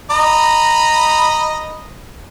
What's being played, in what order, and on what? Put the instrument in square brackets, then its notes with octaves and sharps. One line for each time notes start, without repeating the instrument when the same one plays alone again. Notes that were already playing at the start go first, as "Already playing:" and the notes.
[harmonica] D#5 A#5 B5